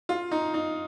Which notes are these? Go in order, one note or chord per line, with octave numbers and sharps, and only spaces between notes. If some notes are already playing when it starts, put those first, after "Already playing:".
F4
D#4
D#4